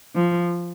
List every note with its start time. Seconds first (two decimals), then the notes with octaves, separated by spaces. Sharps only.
0.15 F3